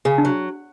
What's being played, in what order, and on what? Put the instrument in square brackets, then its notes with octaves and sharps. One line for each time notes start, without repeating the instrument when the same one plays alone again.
[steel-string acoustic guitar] C#3 [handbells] G#4
[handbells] D4
[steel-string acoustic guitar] F#3